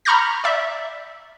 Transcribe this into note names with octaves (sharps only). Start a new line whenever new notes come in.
A#5 B5 C#6 F6 G6 A#6
D5 E5